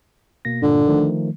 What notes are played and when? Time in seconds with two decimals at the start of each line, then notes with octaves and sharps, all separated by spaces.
0.45 B2 A#3 A#6
0.62 G2 A#2 D3
0.87 D#3 F3 A3